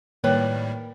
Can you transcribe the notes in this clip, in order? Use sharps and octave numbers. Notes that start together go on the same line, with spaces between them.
A2 D#3 G3 A#3 B4 C#5 D5 G5